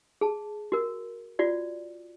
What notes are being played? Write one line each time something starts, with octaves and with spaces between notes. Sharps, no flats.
G#4 A5
F#4 A#4
F4 F#4 D5